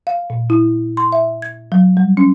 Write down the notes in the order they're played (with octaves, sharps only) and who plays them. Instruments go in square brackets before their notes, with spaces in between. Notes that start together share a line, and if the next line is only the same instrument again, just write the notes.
[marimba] F5
A#2
E4
C6
E5
G#6
F#3
G3
C#4